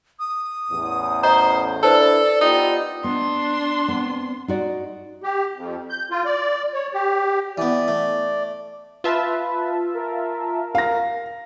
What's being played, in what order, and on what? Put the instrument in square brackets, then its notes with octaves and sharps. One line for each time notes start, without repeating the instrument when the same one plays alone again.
[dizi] D#6
[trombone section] A1 E2
[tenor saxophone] C5 [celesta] D#5 A#5
[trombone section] D4 E4 [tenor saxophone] A4 [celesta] B4 C5 A5 [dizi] D5
[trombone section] B3 F4 G4 [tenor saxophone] D#4
[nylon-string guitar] B3 [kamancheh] D4 C6
[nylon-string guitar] B3 C4
D#4 F#4 D5
[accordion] G4
F2
G6
F4
D5
C#5
G4
[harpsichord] E3 B3 [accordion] D5
[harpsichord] A3
[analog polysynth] F4 E5 A5 [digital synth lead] B4
[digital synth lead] A#4
[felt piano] F5 A#6